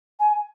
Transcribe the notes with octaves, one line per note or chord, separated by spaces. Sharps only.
G#5